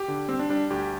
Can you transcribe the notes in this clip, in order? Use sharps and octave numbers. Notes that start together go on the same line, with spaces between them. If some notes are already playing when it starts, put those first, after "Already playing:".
Already playing: G4
D3
G3 C4
D4
G3 D4
D2 G4